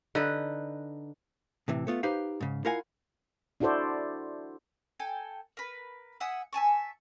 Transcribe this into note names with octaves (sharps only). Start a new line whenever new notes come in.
D3 D#4 B4
A2 C3 E3
A3 B3 F4
D#4 G4 B4 C5 F5
G#2 C#3
E4 F4 A#4 F5 F#5 G#5
D4 E4 F#4 A4 C5 D5
A4 G5 G#5
A#4 B4
E5 F#5 G#5 D#6
E5 G#5 A5 C#6